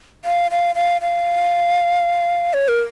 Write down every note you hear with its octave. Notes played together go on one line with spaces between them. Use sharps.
F5
F5
F5
F5
C#5
A#4